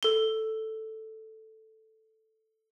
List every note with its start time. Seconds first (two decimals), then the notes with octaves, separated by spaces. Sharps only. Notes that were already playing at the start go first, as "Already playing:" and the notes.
0.03 A4 G7